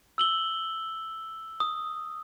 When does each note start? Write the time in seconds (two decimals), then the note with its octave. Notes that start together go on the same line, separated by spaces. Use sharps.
0.18 E6 F#7 G7
1.60 D#6